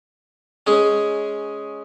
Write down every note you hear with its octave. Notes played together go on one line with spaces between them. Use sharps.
G#3 C#4 G#4